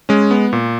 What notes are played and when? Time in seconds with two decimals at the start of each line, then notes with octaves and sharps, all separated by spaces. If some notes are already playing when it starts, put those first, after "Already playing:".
0.09 G#3 C#4
0.31 B3
0.53 A#2